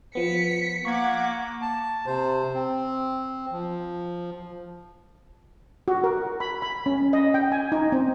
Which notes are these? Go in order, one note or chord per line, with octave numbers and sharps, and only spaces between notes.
F3 B3 B6 C#7
A#3 F#5 C#6 D6 G#6
A5
C3 C5
C4
F3
F#4
A#4
B5
B5
C#4
D#5
G5
G#5
D#4
C4